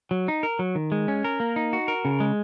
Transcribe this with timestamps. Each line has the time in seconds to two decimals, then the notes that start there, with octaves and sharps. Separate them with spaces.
0.11 F#3
0.28 D#4
0.43 A#4
0.59 F#3
0.75 D#3
0.92 G#3
1.08 C#4
1.24 A#4
1.40 A#3
1.56 D#4
1.73 F#4
1.88 A#4
2.05 C#3
2.20 G#3